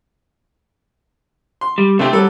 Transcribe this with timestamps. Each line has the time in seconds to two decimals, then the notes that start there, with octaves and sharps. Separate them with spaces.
1.61 C6
1.78 G3
1.99 C3 A3 C4 D4 G4
2.13 F#3 G3 A4